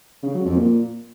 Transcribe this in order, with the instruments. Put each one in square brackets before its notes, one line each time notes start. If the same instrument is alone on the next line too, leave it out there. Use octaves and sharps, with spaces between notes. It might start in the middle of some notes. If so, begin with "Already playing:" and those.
[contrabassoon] C#3
F#3
F2
A#2